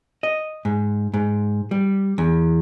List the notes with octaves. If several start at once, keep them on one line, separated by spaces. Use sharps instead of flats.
D#5
G#2
G#2
G3
E2